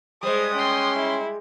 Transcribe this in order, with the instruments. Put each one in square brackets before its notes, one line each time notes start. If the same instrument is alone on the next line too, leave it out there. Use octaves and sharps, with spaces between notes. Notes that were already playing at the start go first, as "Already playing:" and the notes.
[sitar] G3 G#3 [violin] C5 [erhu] D#6
[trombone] C#4 [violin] G5 C6
[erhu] E4